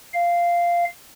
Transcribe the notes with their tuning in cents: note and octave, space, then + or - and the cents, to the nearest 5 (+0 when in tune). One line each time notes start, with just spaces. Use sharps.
F5 -10